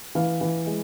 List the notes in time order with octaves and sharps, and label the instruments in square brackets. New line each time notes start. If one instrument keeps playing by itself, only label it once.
[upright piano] E3 F5
E3
G#3